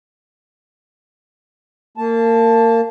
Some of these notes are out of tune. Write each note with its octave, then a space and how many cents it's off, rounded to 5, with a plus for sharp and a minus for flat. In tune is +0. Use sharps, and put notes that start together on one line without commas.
A#3 -25 A5 +0